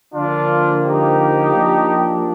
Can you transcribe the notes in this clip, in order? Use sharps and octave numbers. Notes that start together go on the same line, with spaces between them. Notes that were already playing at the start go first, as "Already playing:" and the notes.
D3 F3 A#3 D4 F4
D#4 G4
F3 A#3 D4